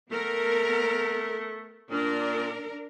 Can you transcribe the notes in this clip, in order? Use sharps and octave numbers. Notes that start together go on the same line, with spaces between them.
A3 B3 A#4
A#2 D4 A#4